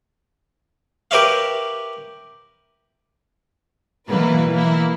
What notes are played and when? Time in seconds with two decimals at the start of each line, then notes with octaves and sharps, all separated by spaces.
1.11 G4 A#4 B4 C#5 E5 F5
4.08 B2 E3 F#3 A#3 E4 B4
4.52 E3 A#3 E4